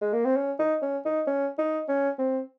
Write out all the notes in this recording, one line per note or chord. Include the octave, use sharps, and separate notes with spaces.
G#3
A#3
C4
C#4
D#4
C#4
D#4
C#4
D#4
C#4
C4